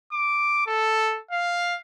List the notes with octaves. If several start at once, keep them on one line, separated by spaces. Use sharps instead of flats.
D6
A4
F5